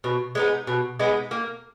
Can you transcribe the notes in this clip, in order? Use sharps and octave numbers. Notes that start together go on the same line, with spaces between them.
B2
G#3 B3 D#4
B2
G#3 B3 D#4
A#3